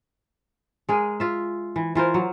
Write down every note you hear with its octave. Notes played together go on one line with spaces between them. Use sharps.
G#3 G#4 A#4
F4 E5
E3
E3 F4 A#4 C5
F#3